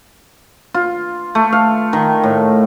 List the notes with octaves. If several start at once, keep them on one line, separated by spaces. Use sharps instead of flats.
F4
A3
F5
D#3
A2